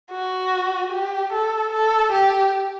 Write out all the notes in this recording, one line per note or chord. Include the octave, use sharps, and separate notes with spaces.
F#4
G4
A4
A4
G4